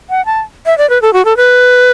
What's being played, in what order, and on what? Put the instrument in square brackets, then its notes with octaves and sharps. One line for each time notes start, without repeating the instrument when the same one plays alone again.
[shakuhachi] F#5
A5
E5
D5
B4
A4
F#4
A4
B4